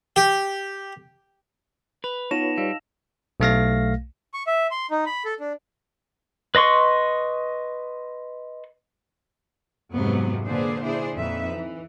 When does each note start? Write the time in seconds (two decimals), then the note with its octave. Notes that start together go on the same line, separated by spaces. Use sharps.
0.16 G4
2.04 B4 F7
2.31 B3 D#4 F4 B4 C#5 A5 A#6 E7
2.58 G3 D#5 F5 E6
3.40 B1 A3 F5 A#6
4.34 C#6
4.47 E5
4.71 C6
4.91 D#4
5.06 B5
5.25 A4
5.40 D4
6.55 B4 D#5 C6 C#6
9.93 F2 G#2 C3 F#3 G#3 B3
10.45 A#2 D3 D4 G#4 B4 C5
10.83 D4 E4 G#4 C5
11.17 F2 A#2 D#4 B4 E5
11.53 E3